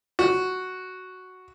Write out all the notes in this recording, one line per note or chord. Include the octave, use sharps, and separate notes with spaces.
F#4